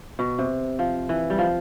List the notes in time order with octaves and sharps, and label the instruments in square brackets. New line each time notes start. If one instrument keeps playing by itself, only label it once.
[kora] B2
C3
F3
E3
G3
F3